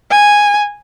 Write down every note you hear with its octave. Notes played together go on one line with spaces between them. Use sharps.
G#5